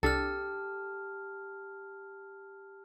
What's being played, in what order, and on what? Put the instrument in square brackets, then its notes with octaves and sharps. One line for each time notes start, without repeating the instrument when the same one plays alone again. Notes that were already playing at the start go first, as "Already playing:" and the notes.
[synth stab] C2 D4 [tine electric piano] G4 [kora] A4 [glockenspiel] A5 F6